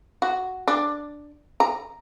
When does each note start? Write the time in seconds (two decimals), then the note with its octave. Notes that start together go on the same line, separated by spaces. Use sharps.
0.22 F#4
0.68 D4
1.60 A#5